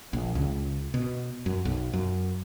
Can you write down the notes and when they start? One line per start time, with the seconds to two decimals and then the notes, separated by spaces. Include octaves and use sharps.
0.13 A#1
0.35 C#2
0.94 B2
1.46 F#2
1.65 B1
1.93 F#2